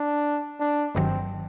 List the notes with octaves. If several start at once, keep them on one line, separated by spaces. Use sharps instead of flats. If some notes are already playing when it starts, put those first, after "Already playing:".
Already playing: D4
D4
G1 G2 D#3 F#3 C4